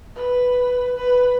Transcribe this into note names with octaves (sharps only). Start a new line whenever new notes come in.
B4
B4